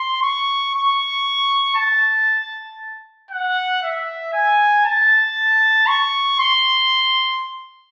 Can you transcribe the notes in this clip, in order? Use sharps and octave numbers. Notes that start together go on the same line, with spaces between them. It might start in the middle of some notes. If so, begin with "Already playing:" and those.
Already playing: C6
C#6
C#6
A5
F#5
E5
G#5
A5
C#6
C6